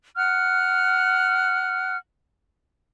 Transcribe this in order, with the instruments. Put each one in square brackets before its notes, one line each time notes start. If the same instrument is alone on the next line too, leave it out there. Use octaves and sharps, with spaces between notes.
[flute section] F#5 F6 F#6